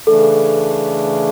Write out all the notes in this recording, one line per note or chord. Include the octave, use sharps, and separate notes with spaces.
C#3 E3 A3 D4 A4